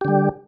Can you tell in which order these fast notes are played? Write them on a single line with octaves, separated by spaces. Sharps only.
G4 D3 G3